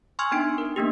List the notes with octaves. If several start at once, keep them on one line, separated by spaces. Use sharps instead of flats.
G#5 C6 C#6 E6 F6 G#6
B3 D4 D#4 G5 D7
A#4
A#3 B3 D4 G4